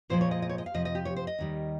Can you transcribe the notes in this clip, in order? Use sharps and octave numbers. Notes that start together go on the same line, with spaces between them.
A#2 F3 G#3 C5
C#5
D#5
D#5
C#5
D#5
F5
F2 C3 F3 D#5
D#5
G4
C#5
C5
D#5
D#2 D#3 G3